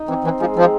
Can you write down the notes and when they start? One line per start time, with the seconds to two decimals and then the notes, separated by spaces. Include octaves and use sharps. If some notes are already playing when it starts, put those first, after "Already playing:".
Already playing: D#4
0.08 E3 C4
0.24 E3 C4
0.40 F3 G#3
0.56 F3 C4